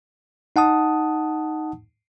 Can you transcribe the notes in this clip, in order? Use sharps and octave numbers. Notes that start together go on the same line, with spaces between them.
D#4 F#5 A5 D#6